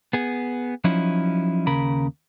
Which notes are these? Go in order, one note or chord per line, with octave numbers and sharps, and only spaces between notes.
B3 G#4
F3 F#3 C#4 D#4 E4
D#2 C#3 A#4 B5